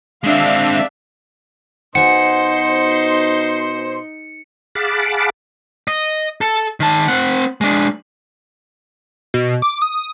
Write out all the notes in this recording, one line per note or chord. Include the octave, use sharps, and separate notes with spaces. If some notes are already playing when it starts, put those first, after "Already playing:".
G#3 C4 D4 E5 F5
B2 D#4 C5 F#5 G#5 C6 C#7
G#4 F5 F#5 A5 B5 D6
D#5
A4
D#3 A5
C4 F#5
G#3 D4
B2
D6
D#6